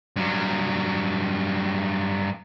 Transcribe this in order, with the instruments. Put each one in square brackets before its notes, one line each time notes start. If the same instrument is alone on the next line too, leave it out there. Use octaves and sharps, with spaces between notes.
[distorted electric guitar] G2 F#3